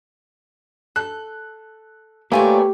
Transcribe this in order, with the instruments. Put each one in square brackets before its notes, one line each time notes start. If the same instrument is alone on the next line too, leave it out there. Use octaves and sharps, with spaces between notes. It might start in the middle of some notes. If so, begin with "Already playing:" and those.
[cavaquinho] A4 [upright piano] F#6
[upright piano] A3 [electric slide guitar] A#3 B4 G#5 [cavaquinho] F4 C#5 D5 [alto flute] G4